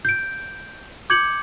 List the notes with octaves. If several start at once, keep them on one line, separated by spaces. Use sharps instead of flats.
G6 D7
D6 G6 G#6 C#7 F#7